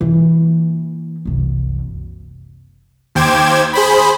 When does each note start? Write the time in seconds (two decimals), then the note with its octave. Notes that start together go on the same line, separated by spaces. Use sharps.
0.01 E3 A#3
1.25 F#1 C2
3.15 D#2 C5 G5 D6 G#6 E7
3.73 G#4 C5 B5